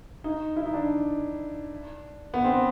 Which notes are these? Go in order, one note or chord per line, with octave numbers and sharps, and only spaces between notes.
D#4
E4
D#4
D4
B3
C4